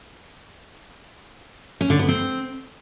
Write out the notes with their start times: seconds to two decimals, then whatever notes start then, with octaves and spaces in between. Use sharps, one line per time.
1.81 C#4
1.90 D3
1.99 B3
2.09 C4